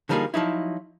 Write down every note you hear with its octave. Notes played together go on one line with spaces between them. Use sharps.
D3 F3 G3 A#3 D#4 G#4
F3 F#3 D#4 E4